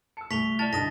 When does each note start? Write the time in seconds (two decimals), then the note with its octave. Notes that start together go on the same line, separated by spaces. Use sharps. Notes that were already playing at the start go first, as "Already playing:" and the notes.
0.17 A5 E6 C#7
0.31 C2 A3 C#6 B6 F7 G7
0.59 E4 D5 A5 A6
0.73 C2 D3 D#4 A5 D#6 A6 A#6